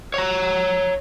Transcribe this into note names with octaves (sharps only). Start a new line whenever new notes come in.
C#5 A#5